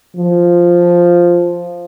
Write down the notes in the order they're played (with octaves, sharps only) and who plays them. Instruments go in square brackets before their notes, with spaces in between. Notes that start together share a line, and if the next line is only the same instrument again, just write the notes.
[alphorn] F3